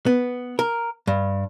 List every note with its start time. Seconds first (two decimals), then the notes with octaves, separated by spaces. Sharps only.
0.06 B3
0.59 A#4
1.07 G2